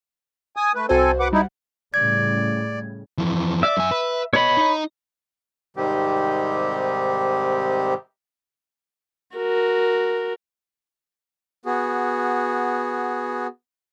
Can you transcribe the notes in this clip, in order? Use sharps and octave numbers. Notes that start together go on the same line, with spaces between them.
G#5 D#6
A3 B4
C2 C4 F#4 A4 C5 G#5
B4 F#5 D6
G3 D#4 E4 F#5
A2 C#3 G3 D5 G#6
F2 E3
D5 E5
F#2 G#5
B4
B3 C#5 D#5 B5
D#4 D#5
G#2 C3 D#3 G3 C4 G4
F#4 A#4
B3 F#4 G#4